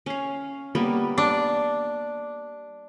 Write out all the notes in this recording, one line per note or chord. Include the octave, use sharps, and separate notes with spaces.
C#4 F5
G3 A#3 B3
D4